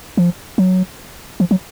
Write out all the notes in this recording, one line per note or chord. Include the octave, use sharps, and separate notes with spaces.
F3
F#3
F3
F#3